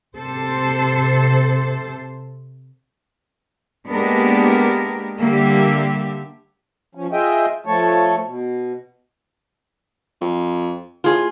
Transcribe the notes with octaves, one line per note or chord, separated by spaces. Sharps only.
C3 A4 C5
G#3 A#3 B3 D4 G4 A#4
D3 G3 A#3 G4 E5
F3 C#4
F4 G#4 D#5 E5 G5
F3 A3 A4 C#5
B2
F2
A2 F4 G#4 G#5